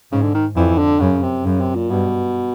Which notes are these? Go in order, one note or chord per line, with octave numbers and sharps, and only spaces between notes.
G#2 C#3
D3
D#3
F2 E3
D3
F#2 C#3
C3
F#2 C#3
C3
A#2
G2 B2